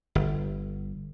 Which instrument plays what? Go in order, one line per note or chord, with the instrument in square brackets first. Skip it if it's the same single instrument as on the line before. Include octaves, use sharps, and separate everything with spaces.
[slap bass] G1